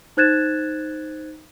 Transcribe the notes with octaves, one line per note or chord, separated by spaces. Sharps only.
D#4 C5 F#6 G#6 A6 E7